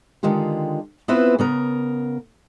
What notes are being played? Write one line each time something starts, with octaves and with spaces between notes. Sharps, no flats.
D3 D#3 G#3 F4 G4
B3 C4 E4 F4 B4
C#3 B3 A#4